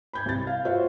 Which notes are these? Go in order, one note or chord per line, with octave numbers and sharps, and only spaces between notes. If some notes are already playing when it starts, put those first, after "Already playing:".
B5 G6 G#6
C2 A6
F5
F4 F#4 C5 C#5 E5 F5